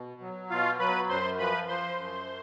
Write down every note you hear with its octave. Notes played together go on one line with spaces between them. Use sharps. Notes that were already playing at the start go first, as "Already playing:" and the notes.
Already playing: B2
F#3
B2 F4 F5
F#3 B4 B5
F#2 C5 C6
F3 B4 B5
F3 C5 C6
F#2